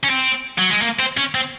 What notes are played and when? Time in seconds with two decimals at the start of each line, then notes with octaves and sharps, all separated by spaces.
0.04 C#4
0.10 C4
0.58 F#3
0.70 G#3
0.82 A#3
0.99 C4
1.17 C#4
1.35 C4